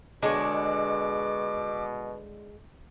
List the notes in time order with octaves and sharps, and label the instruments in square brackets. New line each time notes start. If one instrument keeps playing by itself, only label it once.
[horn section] B2 [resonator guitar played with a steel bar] D3 D4 C#5 [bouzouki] G#3 [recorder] D6